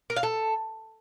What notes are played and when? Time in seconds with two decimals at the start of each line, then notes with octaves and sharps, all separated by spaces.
0.10 A#4
0.16 F5
0.23 A4